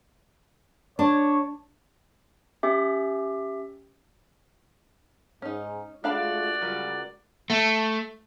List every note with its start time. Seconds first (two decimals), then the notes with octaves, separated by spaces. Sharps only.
0.99 D4 C#5
2.63 C#4 G4 E5
5.42 G#2 C#4 D#4
6.04 G#3 A3 D4 F4 F#4 D5 F5 B5
6.61 C#2 F#3 G3 F4 A#4
7.50 A3